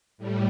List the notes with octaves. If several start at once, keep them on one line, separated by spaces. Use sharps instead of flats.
A2 G3